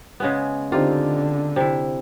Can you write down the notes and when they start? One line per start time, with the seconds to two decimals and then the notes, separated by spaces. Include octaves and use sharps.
0.20 C#3 G#3 B3
0.72 D3 C4 D#4 F4 G4
1.56 C3 E4